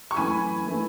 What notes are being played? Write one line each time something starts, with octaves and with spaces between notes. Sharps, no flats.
C#6
F#2 E3 A3 G#5 B5
E3 A3